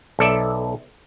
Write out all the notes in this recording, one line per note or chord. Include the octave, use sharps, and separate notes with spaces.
B1 A4 D5 E5